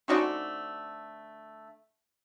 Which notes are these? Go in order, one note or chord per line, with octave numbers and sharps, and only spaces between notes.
D3 A3 C4 C#4 D#4 F#4